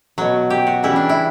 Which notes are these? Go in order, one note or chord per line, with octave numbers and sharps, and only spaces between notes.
B2 F#3
G4
F#4
C#3 E3 G3 E4
D4
E4